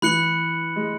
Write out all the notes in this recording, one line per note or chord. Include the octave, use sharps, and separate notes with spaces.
E3 B5 F#6 C#7 F#7
G#3